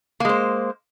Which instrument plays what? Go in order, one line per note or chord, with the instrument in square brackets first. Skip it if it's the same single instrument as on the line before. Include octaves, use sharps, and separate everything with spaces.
[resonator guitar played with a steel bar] A#3
G#3
C5